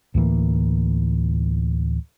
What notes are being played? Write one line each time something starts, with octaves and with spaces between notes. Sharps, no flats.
D2 A2 E3 A#3